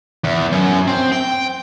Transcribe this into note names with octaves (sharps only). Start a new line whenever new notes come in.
E2
F#2
C4
G5